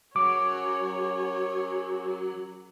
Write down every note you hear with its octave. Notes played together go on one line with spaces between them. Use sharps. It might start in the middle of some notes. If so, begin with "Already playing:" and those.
F#3 C#4 G#4 A#4 C#5 D6